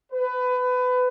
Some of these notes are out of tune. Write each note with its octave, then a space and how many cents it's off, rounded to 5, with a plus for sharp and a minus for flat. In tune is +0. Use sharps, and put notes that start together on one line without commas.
B4 +25